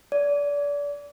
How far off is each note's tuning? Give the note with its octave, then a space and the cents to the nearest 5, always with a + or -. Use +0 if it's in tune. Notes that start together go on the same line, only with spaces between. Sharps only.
D5 -30